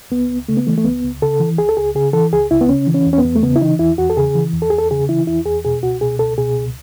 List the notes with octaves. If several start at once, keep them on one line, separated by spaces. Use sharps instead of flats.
C#2 B3
C#2
C#3 A3
B3
E3 A3
A3
C#2 B3
C#2
C#3 A4
E3
C#2 G#4
A4
C#2 G#4
C#3 G#4
E3 A4
C#2 G#4
C#2 E4
B3
C#3 C#4
E3
C#4
E2
C#4
B3
E2
A3
C#3 B3
E4
E3 D#4
E2 E4
E2 F#4
A4
C#3 G#4
E3
E2
A4
E2 G#4
A4
C#3 G#4
E3 E4
E2 E4
E2 G#4
B2 G#4
C#2 F#4
B2 G#4
C#2 A4
B2 G#4
C#2